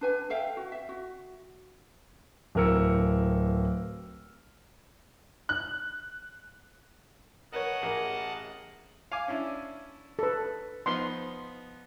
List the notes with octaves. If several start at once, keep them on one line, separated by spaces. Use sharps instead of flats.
D4 B4 G#5
A4 E5 F5 G5
F#4
E5
F#4
D1 C4 A#4 E6 C#7
F#6
A#4 B4 C#5 D#5 F#5 A5
A1 G#4 A#4
F5 G#5 D6
C#4 D4 E4
A4 B4
F3 B3 D#4 C6